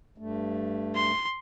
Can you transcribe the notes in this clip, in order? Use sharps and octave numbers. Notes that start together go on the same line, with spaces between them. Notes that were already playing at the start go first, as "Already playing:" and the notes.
G2 A3
C6